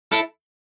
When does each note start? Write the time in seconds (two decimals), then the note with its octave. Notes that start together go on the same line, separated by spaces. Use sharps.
0.12 E4 A4